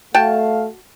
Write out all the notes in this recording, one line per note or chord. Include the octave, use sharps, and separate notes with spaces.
A3 F#4 F5 G5 A5